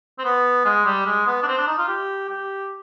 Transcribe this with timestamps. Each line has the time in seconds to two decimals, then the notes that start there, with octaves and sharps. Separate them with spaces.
0.18 C4
0.24 B3
0.65 G#3
0.85 G3
1.06 G#3
1.27 B3
1.42 D4
1.47 C4
1.57 D4
1.67 D#4
1.78 F4
1.88 G4
2.29 G4